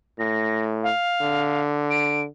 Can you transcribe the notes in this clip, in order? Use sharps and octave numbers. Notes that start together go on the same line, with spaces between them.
A2 A#6
F5
D3
D7